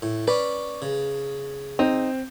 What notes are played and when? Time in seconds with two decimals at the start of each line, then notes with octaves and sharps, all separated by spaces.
0.02 A2
0.27 C#4 B4 D5
0.82 C#3
1.79 C4 D#4